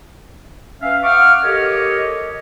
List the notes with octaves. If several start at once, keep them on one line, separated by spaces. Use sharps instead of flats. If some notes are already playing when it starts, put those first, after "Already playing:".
C#4 B4 E5 F5
F5 F#5 C#6 D6 E6 F6
G4 A4 A#4 C#5 D#5